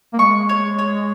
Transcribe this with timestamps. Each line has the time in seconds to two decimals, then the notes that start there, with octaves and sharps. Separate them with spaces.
0.14 A#3
0.19 G#3 C#6
0.49 C#5
0.79 C#5